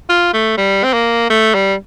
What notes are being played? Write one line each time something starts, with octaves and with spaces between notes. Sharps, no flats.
F4
A3
G3
C4
A#3
A3
G3